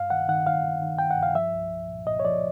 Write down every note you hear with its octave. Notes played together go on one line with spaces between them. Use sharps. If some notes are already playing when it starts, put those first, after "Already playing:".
Already playing: G2 F5
D#3 F#5
D#3 F#5
D#3 F5
D#3
D#3
G2 G5
F#5
G2
F5
F3 E5
C2
C2
A#2
A#2 D#5
C#5
F3 D5